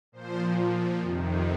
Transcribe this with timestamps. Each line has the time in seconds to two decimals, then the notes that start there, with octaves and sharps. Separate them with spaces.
0.12 A#2 F3 C5
1.00 F2 C3 D#3